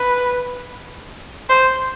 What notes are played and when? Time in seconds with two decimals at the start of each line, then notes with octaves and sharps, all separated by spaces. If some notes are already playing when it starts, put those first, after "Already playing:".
Already playing: B4
1.49 C5